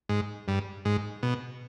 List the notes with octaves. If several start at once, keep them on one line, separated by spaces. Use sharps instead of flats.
G#2
G2
G#2
B2